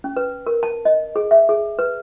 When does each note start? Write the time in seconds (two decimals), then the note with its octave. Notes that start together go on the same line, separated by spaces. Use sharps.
0.04 C#4
0.17 B4
0.47 A#4
0.63 A5
0.85 D#5
1.16 G#4
1.31 E5
1.49 G#4
1.79 B4